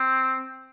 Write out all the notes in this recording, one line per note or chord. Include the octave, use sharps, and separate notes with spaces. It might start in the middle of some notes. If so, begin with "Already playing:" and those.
Already playing: C4